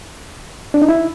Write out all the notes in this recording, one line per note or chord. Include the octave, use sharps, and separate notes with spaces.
D4
D#4
E4